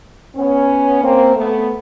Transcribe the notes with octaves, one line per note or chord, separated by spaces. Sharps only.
B3 C#4
A#3 C4
A3 B3